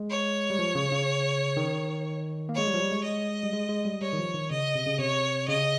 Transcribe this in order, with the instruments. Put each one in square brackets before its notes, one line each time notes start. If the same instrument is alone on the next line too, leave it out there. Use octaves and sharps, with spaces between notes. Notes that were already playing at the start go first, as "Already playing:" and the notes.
Already playing: [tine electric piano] G#3
[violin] C#5
[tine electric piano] G3
F3
C#3
C#3
D#3
A#3
[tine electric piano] G#3 [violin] C#5
[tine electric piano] G3
F3
G3
G#3
[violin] D#5
[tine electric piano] G3
G#3
G#3
G3
[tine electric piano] G3 [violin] C#5
[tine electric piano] D#3
F3
D#3
[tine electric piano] C#3 [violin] D#5
[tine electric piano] C3
C#3
[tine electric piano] C3 [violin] C#5
[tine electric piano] C#3 [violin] D#5